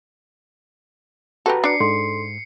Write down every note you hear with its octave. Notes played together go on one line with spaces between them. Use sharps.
F#4 G4 A4 B4 A#5
D4 D5 C7 C#7
G#2 A4 C6